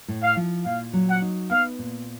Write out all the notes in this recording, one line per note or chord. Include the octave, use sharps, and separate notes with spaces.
A2
F5
F3
A#2 F5
F#3
F#5
D#4
B3 F5
A#2